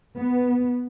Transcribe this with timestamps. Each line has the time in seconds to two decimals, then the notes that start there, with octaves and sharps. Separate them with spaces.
0.17 B3